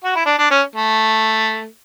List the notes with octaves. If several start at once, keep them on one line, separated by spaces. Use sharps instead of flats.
F#4
E4
D4
D4
C#4
A3